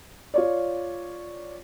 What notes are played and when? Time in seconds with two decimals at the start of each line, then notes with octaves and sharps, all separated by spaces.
0.34 F4 C#5 D5